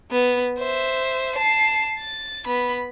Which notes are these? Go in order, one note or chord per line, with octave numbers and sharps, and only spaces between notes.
B3
C5 E5
A5 C7
A6
B3 B5